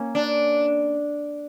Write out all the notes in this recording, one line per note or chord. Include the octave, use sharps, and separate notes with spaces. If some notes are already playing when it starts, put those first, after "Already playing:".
Already playing: A#3 C#4
D4